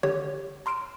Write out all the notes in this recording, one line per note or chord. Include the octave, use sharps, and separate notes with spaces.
D3 G4 C#5
A#5 C6 F6 D7 E7